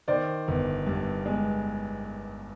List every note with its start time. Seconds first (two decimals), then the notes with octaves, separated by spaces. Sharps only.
0.08 D#3 C5 D5
0.48 G1
0.87 G2
1.26 G#3